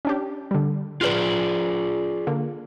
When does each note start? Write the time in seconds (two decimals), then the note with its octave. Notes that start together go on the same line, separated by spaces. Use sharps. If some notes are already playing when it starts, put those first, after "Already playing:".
0.05 C#4 D4 G4
0.51 D3 G3
1.01 F4 G#4 B4 D5 F6
2.27 D3 A#3